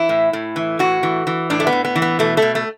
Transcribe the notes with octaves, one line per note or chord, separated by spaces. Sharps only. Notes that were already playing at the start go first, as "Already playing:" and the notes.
Already playing: E3 E4
A2
A2
E3
A2 F#4
E3
E3
A2 D4
A3
B3
A2
B3
E3
B3
B2 A3
A3
B2
A3